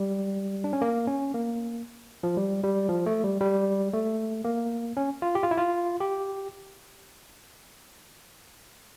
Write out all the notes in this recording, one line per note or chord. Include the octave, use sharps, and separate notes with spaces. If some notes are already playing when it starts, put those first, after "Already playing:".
Already playing: G3
D4
C#4
A#3
C#4
A#3
F3
G3
G3
F3
A3
G3
G3
A3
A#3
C#4
F4
G4
F4
E4
F4
G4